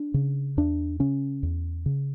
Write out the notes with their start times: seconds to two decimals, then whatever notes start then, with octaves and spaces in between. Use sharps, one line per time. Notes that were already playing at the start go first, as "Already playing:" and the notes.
Already playing: D4
0.14 C#3
0.57 E2 D4
0.99 C#3 C#4
1.43 E2
1.86 C#3